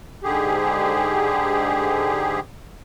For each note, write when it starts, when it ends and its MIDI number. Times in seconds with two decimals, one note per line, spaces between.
0.23 2.40 44
0.23 2.40 50
0.23 2.40 67
0.23 2.40 68